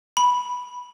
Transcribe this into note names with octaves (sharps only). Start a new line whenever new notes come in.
B5